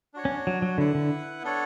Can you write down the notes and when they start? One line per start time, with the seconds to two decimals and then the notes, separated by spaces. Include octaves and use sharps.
0.14 D4 F#4 C#5
0.25 C#4
0.47 F#3
0.62 F#3
0.78 D3 E4 B4 F#5
0.95 D3
1.43 B3 D4 A4 C#5